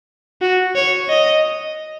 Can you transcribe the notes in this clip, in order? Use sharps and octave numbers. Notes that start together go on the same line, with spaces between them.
F#4
C#5
D#5